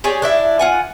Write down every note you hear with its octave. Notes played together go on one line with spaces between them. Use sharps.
G4 G#4 C#5 D5
D4 E4 E5
F4 F#5 G#5